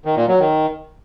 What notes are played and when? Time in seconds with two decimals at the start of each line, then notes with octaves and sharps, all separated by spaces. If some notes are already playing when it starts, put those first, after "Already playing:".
0.05 D#3
0.17 A#2
0.28 F#3
0.39 D#3